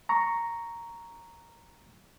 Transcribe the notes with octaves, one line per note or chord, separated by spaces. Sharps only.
A#5 C#6